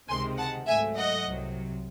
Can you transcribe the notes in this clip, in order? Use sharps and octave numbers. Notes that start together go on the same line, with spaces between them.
C#2 C3 D#3 G#3 G#5 C6
F#5 A5
G#2 F#3 A3 E5 G#5
D#5 F#5
C2 C3 F#3